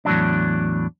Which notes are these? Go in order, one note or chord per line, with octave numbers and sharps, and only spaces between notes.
E2 A2 F#3 D4